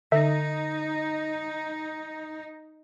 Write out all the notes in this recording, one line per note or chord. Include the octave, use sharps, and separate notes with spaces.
D3 D#4 E5